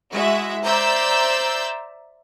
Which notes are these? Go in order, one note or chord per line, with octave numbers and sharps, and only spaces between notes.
G#3 E4 F#4 E5
C5 D5 E5 A#5 E6 G6